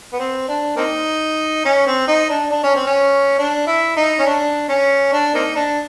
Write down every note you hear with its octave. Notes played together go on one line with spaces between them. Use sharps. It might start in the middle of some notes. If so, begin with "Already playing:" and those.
B3
C4
D4
A#3 C4 D#4
C#4
C4
D#4
D4
D4
C#4
C4
C#4
D4
E4
D#4
C#4
D4
C#4
D4
A#3 C4 D#4
D4